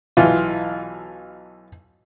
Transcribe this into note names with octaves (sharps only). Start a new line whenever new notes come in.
B1 E3 F4